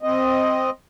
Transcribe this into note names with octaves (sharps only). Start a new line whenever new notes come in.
C4 D#5